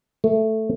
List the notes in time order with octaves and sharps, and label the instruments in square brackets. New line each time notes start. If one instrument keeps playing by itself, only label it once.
[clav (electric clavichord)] A3